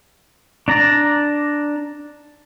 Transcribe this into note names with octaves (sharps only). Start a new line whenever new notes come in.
D4 D5 A#5